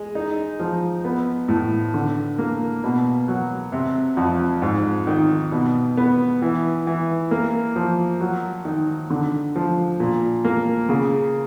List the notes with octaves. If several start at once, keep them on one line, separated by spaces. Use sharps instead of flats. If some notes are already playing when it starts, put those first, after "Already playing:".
Already playing: G#3
D#4
F3
B3
A2
D3
A#3
B2
F#3
C3
F2
G#2
D#3
B2
B3
E3
E3
A#3
F3
F#3
D#3
D3
F3
A#2
A#3
C#3